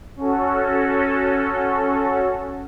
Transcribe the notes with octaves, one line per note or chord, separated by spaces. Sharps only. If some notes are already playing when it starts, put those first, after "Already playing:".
C#4 F#4 A4